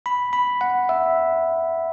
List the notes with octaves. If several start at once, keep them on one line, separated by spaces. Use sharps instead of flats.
B5
B5
F#5
E5